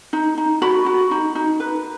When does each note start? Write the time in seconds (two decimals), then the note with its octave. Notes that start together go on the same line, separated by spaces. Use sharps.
0.13 D#4
0.38 D#4
0.62 F#4 B5
0.86 F#4
1.11 D#4
1.35 D#4
1.60 B4